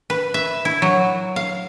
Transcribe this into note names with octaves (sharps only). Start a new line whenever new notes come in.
B4
E5
E4
F#3
F5